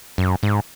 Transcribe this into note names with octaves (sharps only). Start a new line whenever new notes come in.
F#2
G#2